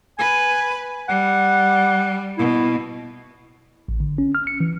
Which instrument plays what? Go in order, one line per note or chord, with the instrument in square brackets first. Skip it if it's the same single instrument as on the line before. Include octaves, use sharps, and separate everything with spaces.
[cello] B4 [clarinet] G#5
[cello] G3 [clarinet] F#5
[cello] B2 [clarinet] E4
[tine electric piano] A1
D3
C#4
F6
C#7
E3